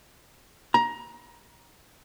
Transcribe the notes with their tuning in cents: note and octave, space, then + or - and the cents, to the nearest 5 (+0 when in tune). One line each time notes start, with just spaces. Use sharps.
A#5 +20